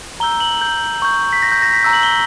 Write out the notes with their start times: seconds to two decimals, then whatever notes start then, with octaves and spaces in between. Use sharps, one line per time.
0.20 A#5 E6 G6 G7
0.40 F#7
0.61 G6
1.02 C#6 G6
1.33 B6
1.43 A#6
1.52 G6
1.62 A#6
1.73 B6
1.83 A#5 E6 G6
1.93 F#7
2.03 G7